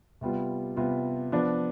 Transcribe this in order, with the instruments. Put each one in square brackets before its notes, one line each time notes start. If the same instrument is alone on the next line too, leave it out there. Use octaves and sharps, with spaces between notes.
[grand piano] C3 G3 B3 F4
C3 G3 B3 F4
F3 B3 D4